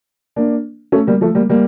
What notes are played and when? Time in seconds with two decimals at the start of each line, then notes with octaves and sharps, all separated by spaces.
0.36 A#3 D4
0.92 A3 C#4
1.07 G3 A#3
1.21 F3 A3
1.35 G3 A#3
1.49 G3 A#3